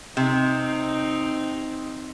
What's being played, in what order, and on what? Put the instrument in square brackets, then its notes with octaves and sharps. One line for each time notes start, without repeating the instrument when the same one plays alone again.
[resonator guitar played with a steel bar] C3 [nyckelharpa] C4 D#4